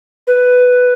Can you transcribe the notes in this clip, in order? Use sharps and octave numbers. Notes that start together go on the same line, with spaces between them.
B4